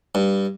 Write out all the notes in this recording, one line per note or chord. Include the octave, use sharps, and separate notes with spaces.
G2